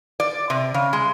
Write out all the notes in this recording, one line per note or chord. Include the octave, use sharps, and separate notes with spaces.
D5
C3
C#3
G#3